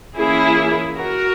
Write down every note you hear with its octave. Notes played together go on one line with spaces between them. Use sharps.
E3 A#3 C#4 E4 G#4
F#4 A#4